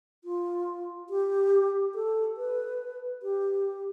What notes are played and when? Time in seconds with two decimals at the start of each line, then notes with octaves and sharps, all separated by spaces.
0.24 F4
1.10 G4
1.95 A4
2.37 B4
3.22 G4